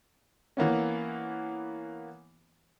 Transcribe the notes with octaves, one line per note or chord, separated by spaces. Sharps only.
E3 A#3 B3 C#4